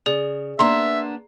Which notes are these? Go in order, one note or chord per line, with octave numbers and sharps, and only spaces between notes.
C#3 G#4 D5
A#3 B3 D4 E5 A#5 C6